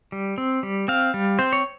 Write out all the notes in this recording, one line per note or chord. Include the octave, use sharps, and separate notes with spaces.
G3
C4
G3
C4 F5
G3
C4 C5
C#5